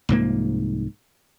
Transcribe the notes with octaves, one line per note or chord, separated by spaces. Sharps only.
C2 G#2 F3 A#3